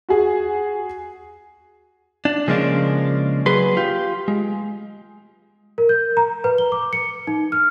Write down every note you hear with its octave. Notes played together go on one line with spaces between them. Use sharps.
F#4 G#4
D4
C#3 F3 G#3 A#3 C#4 D4
F#3 G#4 B4 C6
F4 G4
G#3
A#4
G6
A#5
B4
G7
D6
C#7
D#4
F6